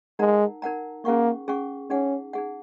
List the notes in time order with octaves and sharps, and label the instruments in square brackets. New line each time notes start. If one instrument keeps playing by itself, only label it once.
[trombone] G#3 [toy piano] D#4 A#4 F#5 A#5
[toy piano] D#4 A#4 F#5 A#5
[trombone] A#3 [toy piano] C#4 G#4 F#5 C#6
[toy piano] C#4 G#4 F#5 C#6
[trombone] C#4 [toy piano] D#4 G#4 F#5
[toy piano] D#4 G#4 F#5